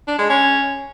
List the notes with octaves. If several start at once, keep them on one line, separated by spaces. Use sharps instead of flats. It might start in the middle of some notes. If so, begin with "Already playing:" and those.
D4
G#3
C#4